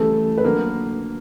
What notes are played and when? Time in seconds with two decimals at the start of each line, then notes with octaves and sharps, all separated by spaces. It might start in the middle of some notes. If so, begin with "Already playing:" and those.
Already playing: C#3 E3 G3 A3 A4
0.38 B4
0.44 D3 F#3 A#3 A#4